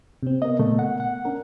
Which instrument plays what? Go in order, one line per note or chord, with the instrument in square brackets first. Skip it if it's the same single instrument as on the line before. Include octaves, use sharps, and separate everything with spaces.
[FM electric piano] C3 C4
[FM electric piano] B3 A#4 [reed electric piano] D#5
[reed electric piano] A#2 C#3 A3
F#5
F#5
[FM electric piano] C#4 D4 A#4